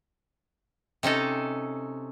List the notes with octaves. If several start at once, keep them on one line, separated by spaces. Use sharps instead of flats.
C3 C#4 D#4 A4